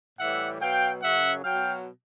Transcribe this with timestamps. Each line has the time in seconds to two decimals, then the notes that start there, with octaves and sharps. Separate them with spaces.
0.18 A2 E3 G3 E5 F#5
0.60 B2 F#3 F5 G5
1.02 F#2 C#3 F#3 E5 F#5
1.44 F#3 F5 G5
1.49 B2